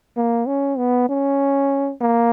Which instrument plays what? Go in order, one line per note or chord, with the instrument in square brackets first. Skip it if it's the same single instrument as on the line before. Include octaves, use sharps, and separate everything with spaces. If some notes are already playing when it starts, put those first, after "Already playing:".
[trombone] A#3
C#4
B3
C#4
A#3